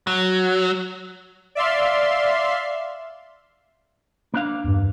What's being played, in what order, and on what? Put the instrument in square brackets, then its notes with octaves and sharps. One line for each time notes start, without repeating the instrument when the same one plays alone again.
[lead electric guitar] F#3
[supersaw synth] D5 E5 F5 C6
[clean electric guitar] A#3 D4 F5
[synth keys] E2 G2